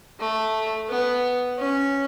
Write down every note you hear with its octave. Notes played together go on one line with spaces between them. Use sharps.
A3
B3
C#4